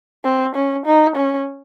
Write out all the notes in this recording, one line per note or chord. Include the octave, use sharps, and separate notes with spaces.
C4
C#4
D#4
C#4